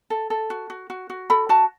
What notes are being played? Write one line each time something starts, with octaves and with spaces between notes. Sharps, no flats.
A4
A4
F#4
F#4
F#4
F#4
A4 B5
F#4 A5